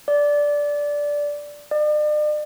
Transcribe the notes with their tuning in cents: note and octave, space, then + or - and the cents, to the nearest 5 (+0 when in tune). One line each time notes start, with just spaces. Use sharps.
D5 -5
D5 +45